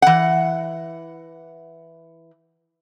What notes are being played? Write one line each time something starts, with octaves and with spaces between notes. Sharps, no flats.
E3 F#5